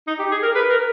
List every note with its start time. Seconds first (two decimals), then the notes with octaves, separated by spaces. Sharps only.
0.08 D#4
0.19 G4
0.31 G#4
0.43 A#4
0.55 B4
0.70 A#4